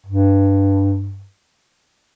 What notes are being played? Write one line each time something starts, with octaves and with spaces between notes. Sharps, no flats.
G2